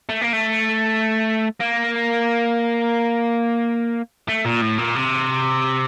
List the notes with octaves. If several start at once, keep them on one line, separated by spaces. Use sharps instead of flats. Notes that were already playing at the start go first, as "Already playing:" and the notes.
A3
A#3
A3
A#3
A3
A#2
A2
A#2
C3